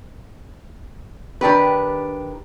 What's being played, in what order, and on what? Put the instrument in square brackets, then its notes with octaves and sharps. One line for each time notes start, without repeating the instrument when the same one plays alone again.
[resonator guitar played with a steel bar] D#3 D4 G4 B4